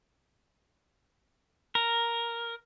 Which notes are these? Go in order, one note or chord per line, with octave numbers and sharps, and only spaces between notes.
A#4